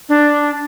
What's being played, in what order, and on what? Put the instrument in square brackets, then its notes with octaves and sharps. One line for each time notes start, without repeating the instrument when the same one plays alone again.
[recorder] D4